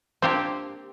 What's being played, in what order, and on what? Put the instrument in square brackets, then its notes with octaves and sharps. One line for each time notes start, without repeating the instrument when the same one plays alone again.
[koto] A#3 C4 G4 [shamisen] D4 F4 C5